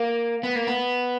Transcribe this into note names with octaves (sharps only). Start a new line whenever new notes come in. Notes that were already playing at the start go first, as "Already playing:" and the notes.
Already playing: A#3
B3
A#3
B3